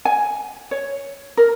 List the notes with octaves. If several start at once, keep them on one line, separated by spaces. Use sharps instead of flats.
G#5
C#5
A#4